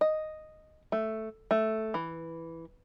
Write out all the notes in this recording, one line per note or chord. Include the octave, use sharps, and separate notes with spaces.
D#5
A3
A3
E3